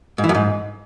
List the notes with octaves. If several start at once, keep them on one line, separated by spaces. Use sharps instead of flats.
G#2
E3
F#2
G#2